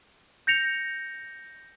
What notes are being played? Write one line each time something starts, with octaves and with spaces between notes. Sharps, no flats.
G6 A#6 C#7 F7